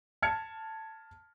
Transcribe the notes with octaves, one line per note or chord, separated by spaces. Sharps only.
A5 F6 G#6 C#7